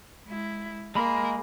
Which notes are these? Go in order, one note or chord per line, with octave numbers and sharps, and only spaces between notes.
G#3 E4
G#3 A#3 A#4 B5